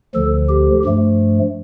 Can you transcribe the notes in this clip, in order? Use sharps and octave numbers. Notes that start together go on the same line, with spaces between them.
D2 D3 F3 A4
G4
G2 F3 A3